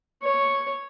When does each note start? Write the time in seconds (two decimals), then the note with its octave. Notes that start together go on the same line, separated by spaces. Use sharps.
0.23 C#5